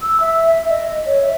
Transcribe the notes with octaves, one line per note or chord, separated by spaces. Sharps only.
E6
E5
E5
D#5
C#5
E5